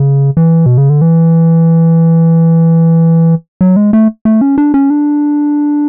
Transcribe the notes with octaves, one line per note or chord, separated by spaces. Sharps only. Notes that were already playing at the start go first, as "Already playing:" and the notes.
Already playing: C#3
E3
B2
C#3
D3
E3
F#3
G#3
A3
A3
C#4
D4
C#4
D4